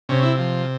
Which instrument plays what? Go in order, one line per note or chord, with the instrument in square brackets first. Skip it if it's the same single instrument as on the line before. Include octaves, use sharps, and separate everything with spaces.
[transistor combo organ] C3 C#4
E4
F3